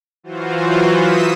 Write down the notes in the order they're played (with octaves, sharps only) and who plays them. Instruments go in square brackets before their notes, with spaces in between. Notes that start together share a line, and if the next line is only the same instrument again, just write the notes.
[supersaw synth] E3 F#3 F4 F#4 C5
D#6 E6 B6 C#7 D#7 E7